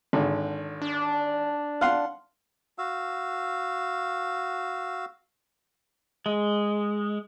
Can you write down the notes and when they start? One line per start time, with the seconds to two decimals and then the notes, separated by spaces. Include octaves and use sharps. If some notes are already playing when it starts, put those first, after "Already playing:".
0.13 G#1 D3
0.82 D4
1.81 F5 F#5 C6
2.78 F#4 F5 E6
6.26 G#3